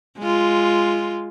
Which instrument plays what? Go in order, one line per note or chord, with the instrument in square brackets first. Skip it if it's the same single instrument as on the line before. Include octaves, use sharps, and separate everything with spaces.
[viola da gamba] G#3 F4